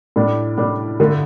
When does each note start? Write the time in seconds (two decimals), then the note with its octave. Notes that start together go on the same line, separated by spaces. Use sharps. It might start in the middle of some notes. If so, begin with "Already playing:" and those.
0.16 A2 G3 D4
0.57 A2 G3 D4
1.00 G2 D3 A3